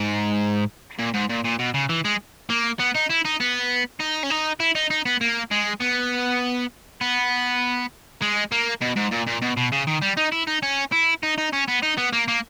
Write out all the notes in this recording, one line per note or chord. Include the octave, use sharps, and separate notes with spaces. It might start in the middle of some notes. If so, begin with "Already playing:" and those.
Already playing: G#2
A#2
G#2
A#2
A#2
B2
C#3
E3
G#3
A#3
B3
D#4
E4
D#4
B3
D#4
C#4
D#4
E4
D#4
D#4
B3
A#3
G#3
B3
B3
G#3
A#3
B2
G#2
A#2
A#2
B2
B2
C#3
D#3
G3
D#4
E4
D#4
C#4
E4
D#4
D#4
C#4
B3
D#4
B3
A#3
A#3